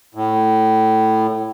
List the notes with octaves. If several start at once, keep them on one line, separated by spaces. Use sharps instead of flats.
A2